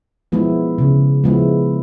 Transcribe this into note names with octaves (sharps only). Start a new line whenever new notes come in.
F3 G#3 B3 E4
C#3
F3 G#3 B3 E4